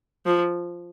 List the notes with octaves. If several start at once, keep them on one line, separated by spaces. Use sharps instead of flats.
F3